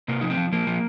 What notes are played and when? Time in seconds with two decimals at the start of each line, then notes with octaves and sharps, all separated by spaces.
0.08 C3 A#3
0.21 F3 D#4
0.30 C4
0.37 F3
0.52 F3 A#3
0.67 F3